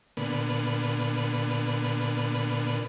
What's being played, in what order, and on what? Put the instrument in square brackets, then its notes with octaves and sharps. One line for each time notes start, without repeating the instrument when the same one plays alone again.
[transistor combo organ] A#2 D3 B3